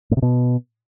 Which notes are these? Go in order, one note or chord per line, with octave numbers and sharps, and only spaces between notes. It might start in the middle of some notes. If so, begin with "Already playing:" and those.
A2
C3
B2